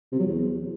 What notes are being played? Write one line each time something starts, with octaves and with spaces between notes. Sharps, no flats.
C3
F#3
E2